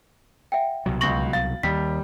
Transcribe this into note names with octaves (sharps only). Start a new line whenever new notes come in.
E5 F#5 G5
C2 B2 F#3
C#2 C#6 A#6 F#7 G7
F5 A6
D#2 G3 B6